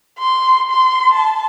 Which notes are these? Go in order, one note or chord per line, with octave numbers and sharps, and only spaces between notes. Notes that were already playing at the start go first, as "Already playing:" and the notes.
C6
C6
A5